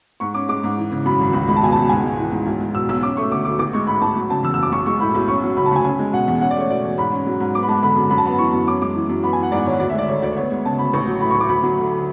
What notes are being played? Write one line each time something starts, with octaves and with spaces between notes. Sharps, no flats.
G#2 C#6
C#4 D6
G#3 D6
G#2
E3
C#3
F#2 B5
G#1
C#2 B5
G#3 B5
A5
B2 G#5
A5
C#2
G#2 G#5
G#3
E3
G#2
B1
G#3
B2 E6
B1 E6
C#4 D6
A3 C#6
D3 D6
D2 D6
A1 D6
G#3 C#6
G#2 B5
A1 A5
F#3
C#3 A5
E2 E6
E6
F#1
D6
B1 C#6
G#3 C#6
A2 B5
B1
C#4 C#6
F#3
C#3 B5
A5
D2 G#5
C#4 G#5
G#3
B2 F#5
E2
C#4 F#5
D5
A3 C#5
B2 D5
E2
G#2 B5
C#4
F#3
G#2
B3 D6
B5
G#3 A5
D3 B5
F#2
F#2 B5
A5
B3 B5
E3 C#6
F#2
C#4 D6
G#3 D6
E3
F#2
B3 B5
G#5
E3
F#5
G#2 D5
G#1 C#5
D2 D5
E5
G#3 D5
D3 C#5
D2 D5
B3 C#5
G#3
C#3 A5
D2 B5
A1 C#6
F#3
A2 B5
C#6
A1
D6
D2 B5
F#3
D3